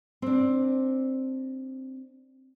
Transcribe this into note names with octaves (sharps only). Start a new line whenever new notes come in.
C4 D4